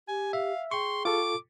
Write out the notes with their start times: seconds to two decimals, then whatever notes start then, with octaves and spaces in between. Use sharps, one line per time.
0.08 G4 G#5
0.33 E5 F5
0.71 G#4 G5 C6 C#6
1.05 F4 A4 D6